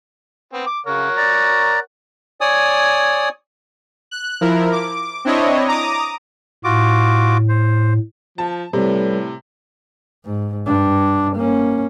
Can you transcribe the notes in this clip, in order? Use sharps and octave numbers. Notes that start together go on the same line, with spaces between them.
B3 C4
D6
C#3 A#4 C#5 F#5
D5 A#5
C#5 D5 G#5 D#6
F#6
F3 E4 A#4
D6
C4 D4 E4 C#5 D#5
A#5 D6 D#6
A2 F4 F#4 D6
C5
F3 A5
A2 C3 G3 A4 B4 C#5
G#2
G2 D4
A#3 C#4